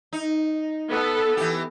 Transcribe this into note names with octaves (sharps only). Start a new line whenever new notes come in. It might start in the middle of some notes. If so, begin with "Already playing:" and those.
D#4
B3 A4
E3 G4